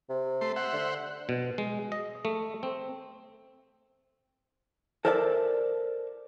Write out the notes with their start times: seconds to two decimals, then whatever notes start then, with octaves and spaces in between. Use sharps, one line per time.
0.09 C3
0.41 A3 C6
0.56 C5 E5 F#5
0.73 D3
1.29 B2
1.58 G#3
1.92 D#5
2.25 A3
2.63 C4
5.05 A4 A#4 C5 D5 E5 A5